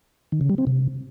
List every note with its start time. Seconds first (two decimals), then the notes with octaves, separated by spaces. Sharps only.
0.32 D#3
0.41 C#3
0.50 G3
0.58 C4
0.67 C3